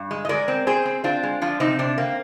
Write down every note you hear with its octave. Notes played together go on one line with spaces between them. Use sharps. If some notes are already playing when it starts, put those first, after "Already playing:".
Already playing: G2
G#3
D#5
G#3 A#4 D5
C4
C4 G#4 C5
C4
C4 D4 F4
G#3
F3 D4 F4
C3 C4 D#4
C3 D4
A#3 C4